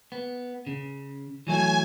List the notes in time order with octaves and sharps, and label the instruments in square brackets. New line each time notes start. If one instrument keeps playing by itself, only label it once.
[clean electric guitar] B3
C#3
[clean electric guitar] E3 F#3 A3 [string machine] G#5